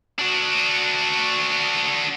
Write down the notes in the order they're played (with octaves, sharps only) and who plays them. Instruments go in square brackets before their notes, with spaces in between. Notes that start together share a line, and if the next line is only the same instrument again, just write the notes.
[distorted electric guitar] D4 F#4